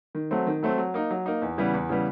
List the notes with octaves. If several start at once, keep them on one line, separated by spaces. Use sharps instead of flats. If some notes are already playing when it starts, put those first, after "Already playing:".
D#3
F#3 A3 C4
D#3
F#3 A3 C4
F#3
A#3 D#4
F#3
A#3 D#4
E2
C#3 E3 G3 B3
E2
C#3 E3 G3 B3